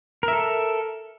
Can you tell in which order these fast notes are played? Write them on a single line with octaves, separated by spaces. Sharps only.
A#4 E5 A4